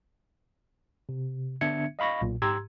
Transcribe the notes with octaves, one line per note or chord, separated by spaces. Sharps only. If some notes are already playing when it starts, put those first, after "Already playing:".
C3
D3 B3 D4 E5 G#6 C#7
D#5 F5 B5 C#6 A#6
B1 A#2
G#2 G4 A#5 C6 E6 G#6